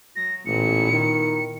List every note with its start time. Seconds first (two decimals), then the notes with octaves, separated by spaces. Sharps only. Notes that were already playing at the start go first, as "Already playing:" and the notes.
0.16 F#3 A#6
0.46 A1 A#2 B3 E4 C#7
0.92 D#3